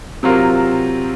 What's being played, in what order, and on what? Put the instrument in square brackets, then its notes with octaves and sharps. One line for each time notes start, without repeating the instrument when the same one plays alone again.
[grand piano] C3 F#3 C4 F4 A#4